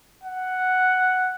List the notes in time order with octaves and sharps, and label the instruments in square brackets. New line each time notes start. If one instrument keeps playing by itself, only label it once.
[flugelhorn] F#5